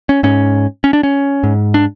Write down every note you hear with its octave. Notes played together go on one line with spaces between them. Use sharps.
C#4
G#2 C#4
C#4
D4
C#4
G#2
D4